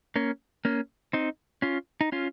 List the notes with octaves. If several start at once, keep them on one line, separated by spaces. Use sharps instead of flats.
A#3 C#4
A#3 C#4
C4 D#4
C#4 F4
D#4
C#4 F4